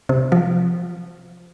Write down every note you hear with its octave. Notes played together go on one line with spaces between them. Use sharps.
C3
F3